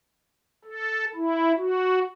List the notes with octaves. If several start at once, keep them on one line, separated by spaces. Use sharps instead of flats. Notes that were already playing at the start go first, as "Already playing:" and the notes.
A4
E4
F#4